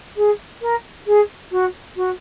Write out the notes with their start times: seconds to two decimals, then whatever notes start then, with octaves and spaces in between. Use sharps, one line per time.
0.16 G#4
0.61 A#4
1.06 G#4
1.51 F#4
1.96 F#4